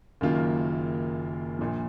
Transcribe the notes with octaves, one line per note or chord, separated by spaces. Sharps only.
F#1 F#2 D#3 A#3 F4
A#1 A#2 F3